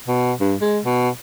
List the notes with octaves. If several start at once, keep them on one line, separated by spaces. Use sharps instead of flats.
B2
G2
G#3
B2